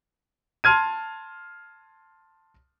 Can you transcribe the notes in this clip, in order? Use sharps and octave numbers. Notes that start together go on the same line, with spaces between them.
A5 C6 F6 G#6 D#7